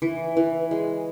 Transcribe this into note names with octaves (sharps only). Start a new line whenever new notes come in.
E3
E3
G#3